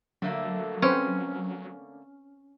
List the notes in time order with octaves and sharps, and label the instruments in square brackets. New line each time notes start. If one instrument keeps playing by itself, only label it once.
[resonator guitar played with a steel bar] D3 A3 A#3 [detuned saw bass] F#3
[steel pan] C4 B4 C5 [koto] C#4